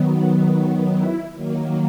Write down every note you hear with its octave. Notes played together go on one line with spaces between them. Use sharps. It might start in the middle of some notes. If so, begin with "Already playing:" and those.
Already playing: D#3 F#3 B3
E4
D#3 F#3 A#3